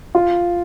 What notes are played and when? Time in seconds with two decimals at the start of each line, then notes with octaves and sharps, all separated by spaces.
0.15 F4